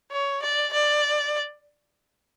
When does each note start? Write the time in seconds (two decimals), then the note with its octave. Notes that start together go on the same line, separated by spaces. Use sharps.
0.11 C#5
0.43 D5
0.73 D5